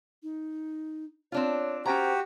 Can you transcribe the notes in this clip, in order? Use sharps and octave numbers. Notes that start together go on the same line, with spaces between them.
D#4
C4 D4 F4 C#5
C#4 F#4 G4 C5 G5 A#5